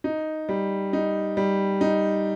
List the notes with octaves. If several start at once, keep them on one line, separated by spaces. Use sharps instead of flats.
D#4
G3
D#4
G3
D#4